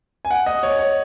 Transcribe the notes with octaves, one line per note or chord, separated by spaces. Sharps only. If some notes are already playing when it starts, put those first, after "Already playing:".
G#5
F#5
D#5
C#5
C#5